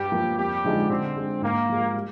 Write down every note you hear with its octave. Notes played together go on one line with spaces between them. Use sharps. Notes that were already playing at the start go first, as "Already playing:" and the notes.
Already playing: G2 G3 G4
F3 A#3
F2 G3 G4
D3 F3 G#3 D#4
D3 C4
G#3 D4
G#2 A#3
F3 G#3
G3